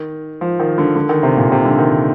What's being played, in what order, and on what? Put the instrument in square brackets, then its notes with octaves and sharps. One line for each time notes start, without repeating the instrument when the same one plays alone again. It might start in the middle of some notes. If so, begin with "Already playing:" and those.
Already playing: [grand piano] D#3
F3
D#3
D3
D3
D#3
C3
A#2
C3
D3
D#3